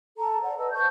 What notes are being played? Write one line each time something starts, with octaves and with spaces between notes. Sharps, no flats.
A4 A5 A#5
C5 D5 F#5 A#5
A4 B4 D#5 E6
C5 A5 C#6 G6